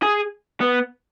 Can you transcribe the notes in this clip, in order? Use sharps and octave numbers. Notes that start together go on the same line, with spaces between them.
G#4
B3